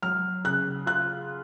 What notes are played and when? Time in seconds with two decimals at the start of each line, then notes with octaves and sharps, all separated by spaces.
0.02 F#3 F6
0.44 C#3 F#6
0.86 F4 F#6